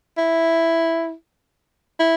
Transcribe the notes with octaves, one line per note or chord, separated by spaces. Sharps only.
E4
E4